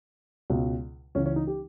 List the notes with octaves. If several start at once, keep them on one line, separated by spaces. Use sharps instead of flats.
C#2 B2
C#2 C#3 E3 C#4
C#4
D#4
G4